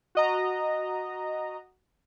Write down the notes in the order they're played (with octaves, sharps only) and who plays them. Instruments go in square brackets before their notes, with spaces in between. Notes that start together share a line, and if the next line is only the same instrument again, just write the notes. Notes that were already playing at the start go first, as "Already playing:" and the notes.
[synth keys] F#4 D#5 A#5